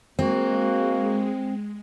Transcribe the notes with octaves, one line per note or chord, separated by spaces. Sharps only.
G#3 A#3 C4 F#4